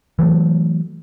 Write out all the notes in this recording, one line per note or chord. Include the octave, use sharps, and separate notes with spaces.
E3 F#3 A3